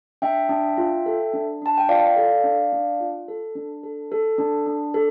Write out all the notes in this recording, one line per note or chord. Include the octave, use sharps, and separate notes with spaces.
D4 E5 G5
D4
F4
A4
D4
D4 A5
G5
F4 D5 F5
A4
D4
D4
F4
A4
D4
A4
A4
D4
D4
A4